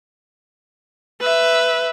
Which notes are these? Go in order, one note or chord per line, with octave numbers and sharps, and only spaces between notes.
B4 E5